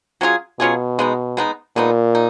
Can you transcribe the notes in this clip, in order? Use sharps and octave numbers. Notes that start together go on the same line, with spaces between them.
F#3 C#4 F4 G#4
B2 F#3 C#4 F4 G#4
G#3 B3 D#4
G#3 B3 D#4
A#2 G#3 B3 D#4
D#4